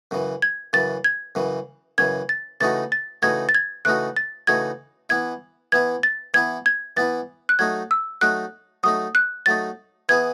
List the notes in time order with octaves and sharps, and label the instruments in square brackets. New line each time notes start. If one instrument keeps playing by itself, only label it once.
[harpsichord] F#2 C#3 E3
[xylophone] G#6
[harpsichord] F#2 C#3 E3 [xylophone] A6
[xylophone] G#6
[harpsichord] F#2 C#3 E3
[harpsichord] F#2 C#3 E3 [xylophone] G#6
[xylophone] A6
[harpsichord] C#3 E3 A3 D#4 F#4 [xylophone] A6
[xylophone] A6
[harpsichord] C#3 E3 A3 D#4 F#4 [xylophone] G#6
[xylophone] A6
G#6
[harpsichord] C#3 E3 A3 D#4 F#4 [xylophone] F#6
[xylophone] A6
[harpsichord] C#3 E3 A3 D#4 F#4 [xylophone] G#6
[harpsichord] E3 B3 E4 [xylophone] G#6
[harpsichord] E3 B3 E4 [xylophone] G#6
[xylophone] A6
[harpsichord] E3 B3 E4 [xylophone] G#6
[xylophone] G#6
[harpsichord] E3 B3 E4 [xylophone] A6
[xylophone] F#6
[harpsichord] F#3 A3 D#4 [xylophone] G#6
[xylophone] E6
[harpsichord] F#3 A3 D#4 [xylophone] F#6
[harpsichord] F#3 A3 D#4 [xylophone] D#6
[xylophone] F#6
[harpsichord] F#3 A3 D#4 [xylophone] A6
[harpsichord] E3 B3 E4 G#4 [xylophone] G#6